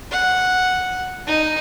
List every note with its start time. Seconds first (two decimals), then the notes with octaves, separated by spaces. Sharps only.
0.11 F#5
1.27 D#4